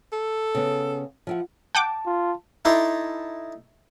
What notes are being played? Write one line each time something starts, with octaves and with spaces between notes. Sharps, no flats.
A4
C#3 B3
F3 E4 F#5
F#5 G5 A5 D6
F4
D#4 E4 A4 D5 A#5 C6